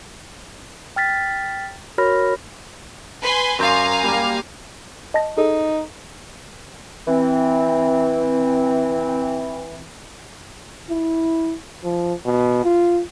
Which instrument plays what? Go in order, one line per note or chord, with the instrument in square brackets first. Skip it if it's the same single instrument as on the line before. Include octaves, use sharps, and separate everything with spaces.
[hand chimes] G5 F6 A6 B6
F#4 A#4 C#5 B5 F6 A#6
[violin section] B4 G#5 C6
[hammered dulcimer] F#2 C5 D5 [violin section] F5 G#5 A#5
[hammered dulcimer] G3 A#3
[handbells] D#5 A5 A#6
[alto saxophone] D#4 [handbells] G#4 A4
[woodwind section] E3 C4
[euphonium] E4
F3
B2
F4